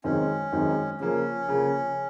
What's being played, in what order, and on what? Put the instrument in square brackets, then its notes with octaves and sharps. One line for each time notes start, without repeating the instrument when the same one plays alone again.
[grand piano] F#2 D#3 G#3 C4 D#4 [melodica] C#4
[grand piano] F#2 D#3 G#3 C4 D#4
[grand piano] C#3 F3 A#3 [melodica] C#4
[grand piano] C#3 F3 A#3